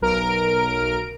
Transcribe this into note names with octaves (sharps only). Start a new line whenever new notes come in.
B1 A#4 D7